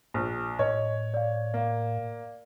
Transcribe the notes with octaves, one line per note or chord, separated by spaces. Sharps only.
A#1
A2 C#5 D#5
D5 F5
A#3